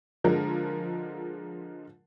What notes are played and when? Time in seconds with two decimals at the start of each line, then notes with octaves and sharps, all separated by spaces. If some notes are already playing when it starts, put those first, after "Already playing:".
0.24 D3 F3 G#3 F4 A#4